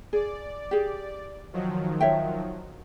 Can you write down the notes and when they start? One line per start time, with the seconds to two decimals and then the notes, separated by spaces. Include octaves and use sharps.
0.13 G#4 D5
0.71 G4 G#4
1.53 D#3 F3 F#3
2.00 C#5 E5 G5